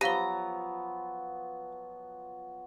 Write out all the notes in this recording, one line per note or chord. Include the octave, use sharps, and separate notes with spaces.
F3 F#3 B3 G4 F5 A#5 G7